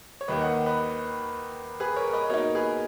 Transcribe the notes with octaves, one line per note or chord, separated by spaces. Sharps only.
C#5
D#2 D#3 A#3 B4 D#5
D#5 F#5
B4 D#5
G#4 B4
A#4 C#5
B4 D#5
B2 A#3 D#4 A#4 C#5
G#4 B4